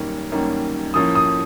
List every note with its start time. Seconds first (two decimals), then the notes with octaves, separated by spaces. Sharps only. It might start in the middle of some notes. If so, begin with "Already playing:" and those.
Already playing: F#2 D#3 G3 A#3 C#4
0.32 F#2 D#3 G3 A#3 C#4
0.94 A2 F3 A#3 C#4 D#6
1.15 D#6